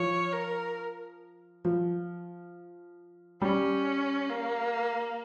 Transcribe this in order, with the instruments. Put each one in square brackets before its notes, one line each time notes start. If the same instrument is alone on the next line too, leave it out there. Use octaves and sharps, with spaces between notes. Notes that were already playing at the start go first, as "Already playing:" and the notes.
Already playing: [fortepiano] F3 [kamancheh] C#5
[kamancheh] A#4
[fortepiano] F3
[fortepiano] G3 [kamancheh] C#4
[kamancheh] A#3